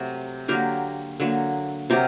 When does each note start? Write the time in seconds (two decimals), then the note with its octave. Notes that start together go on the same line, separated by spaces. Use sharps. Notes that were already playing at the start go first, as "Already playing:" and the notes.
Already playing: C3 F#3 A3
0.48 D3 F#3 A#3 G4 A#4
1.20 D3 F#3 A#3
1.90 C3 F#3 G4 A#4